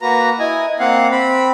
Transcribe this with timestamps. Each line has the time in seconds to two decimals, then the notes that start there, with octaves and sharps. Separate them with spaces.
0.01 A#3 F#4 B4 A#5
0.39 E4 D#5 G#5
0.80 A#3 C4 F5 F#5
1.11 C4 B5